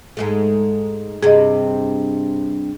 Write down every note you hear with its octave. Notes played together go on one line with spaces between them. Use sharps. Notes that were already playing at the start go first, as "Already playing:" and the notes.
G#2 G#3 A3
G2 C3 G#4 D#5